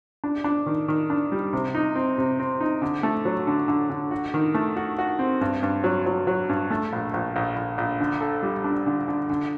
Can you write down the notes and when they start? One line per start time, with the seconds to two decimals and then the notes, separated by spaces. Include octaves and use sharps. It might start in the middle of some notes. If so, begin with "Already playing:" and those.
0.24 D4
0.44 D4
0.66 D#3
0.88 D#3
1.10 D4
1.32 G3
1.53 C3
1.75 D#4
1.95 C4
2.18 C3
2.39 C4
2.61 D#4
2.82 D3
3.03 A3
3.25 F#3
3.47 D3
3.68 D3
3.90 D3
4.11 F#4
4.34 D#3
4.54 A3
4.76 F#4
4.99 F#4
5.19 C4
5.41 G2
5.63 G2
5.84 F#3
6.06 F#3
6.27 F#3
6.49 G2
6.71 A3
6.93 A#1
7.14 A#1
7.36 A#1
7.56 A#1
7.78 A#1
8.00 D3
8.21 A4
8.43 G3
8.64 D4
8.86 D3
9.08 D3
9.30 D3